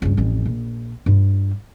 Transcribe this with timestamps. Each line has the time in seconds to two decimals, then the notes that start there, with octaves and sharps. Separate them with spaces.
0.02 C#2 G2
0.17 A1 F2
0.45 A#1
1.06 G2 F4